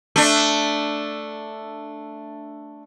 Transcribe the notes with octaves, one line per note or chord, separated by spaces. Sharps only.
A3 D4